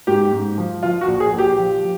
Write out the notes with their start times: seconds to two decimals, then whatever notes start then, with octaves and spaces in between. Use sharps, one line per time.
0.07 G#2 G4
0.32 G#2
0.58 F3
0.83 F3 F4
1.01 F#4
1.07 A#1
1.20 G#4
1.33 A#1
1.38 G4
1.58 F3
1.82 F3